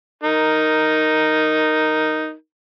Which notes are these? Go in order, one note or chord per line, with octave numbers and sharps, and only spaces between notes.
D#4 A#4